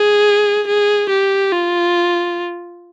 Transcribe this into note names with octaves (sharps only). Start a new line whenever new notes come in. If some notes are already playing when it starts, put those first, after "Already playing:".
Already playing: G#4
G#4
G4
F4